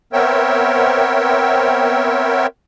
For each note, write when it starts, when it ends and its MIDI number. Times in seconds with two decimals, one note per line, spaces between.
0.13 2.47 59
0.13 2.47 60
0.13 2.47 70
0.13 2.47 73
0.13 2.47 76
0.13 2.47 79